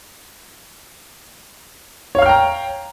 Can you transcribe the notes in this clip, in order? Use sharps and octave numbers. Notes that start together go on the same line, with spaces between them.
C#5 F5 G5 A#5 F6